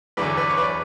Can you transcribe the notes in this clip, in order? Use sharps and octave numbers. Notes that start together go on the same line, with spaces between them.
E2 D3 F#3 B4 D5
B4 D5
C#5
B4 D5